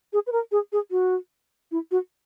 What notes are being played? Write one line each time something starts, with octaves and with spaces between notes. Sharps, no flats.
G#4
B4
A#4
G#4
G#4
F#4
E4
F#4